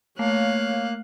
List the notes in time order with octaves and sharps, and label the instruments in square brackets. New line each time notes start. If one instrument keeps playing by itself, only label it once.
[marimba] A3 [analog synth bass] A#3 [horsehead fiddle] C#5 [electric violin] F5 F#6